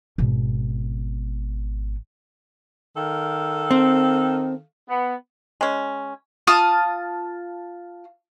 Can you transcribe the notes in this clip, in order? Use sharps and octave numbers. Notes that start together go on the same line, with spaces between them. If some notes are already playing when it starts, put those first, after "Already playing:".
G#1 B2
D#3 A4 F5
C4
B3
G#3 C#4
F4 A5 D#6 F6